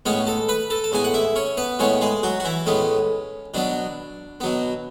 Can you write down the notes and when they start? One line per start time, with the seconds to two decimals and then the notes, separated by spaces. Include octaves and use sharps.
0.06 A2 G#3 B3 C#4 C#5
0.27 A4 A5
0.49 B4 B5
0.70 A4 A5
0.84 A5
0.92 A2 G#3 B3 G#5
1.04 F#5
1.14 E4 E5
1.36 C#4 C#5
1.57 B3 B4
1.79 A2 G#3 B3 C#4 C#5
2.01 G#3 G#4
2.23 F#3 F#4
2.40 F#4
2.45 E3 E4
2.66 A2 G#3 B3 C#4
3.54 B2 F#3 B3 D4
4.40 B2 F#3 B3